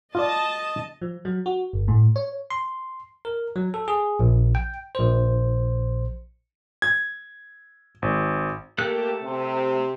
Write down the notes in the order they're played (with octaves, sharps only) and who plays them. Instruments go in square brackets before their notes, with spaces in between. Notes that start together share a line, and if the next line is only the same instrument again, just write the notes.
[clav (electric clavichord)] F4 D5 [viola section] D#5 A5
[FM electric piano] F3
F#3
F#4
G1
A2
C#5
[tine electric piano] C6
A#4
F#3
A4
G#4
A#1
G5
A#1 C5
[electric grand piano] G#6
G#1
[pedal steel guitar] A3 A4 F#6 [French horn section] A#3 G4
[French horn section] C3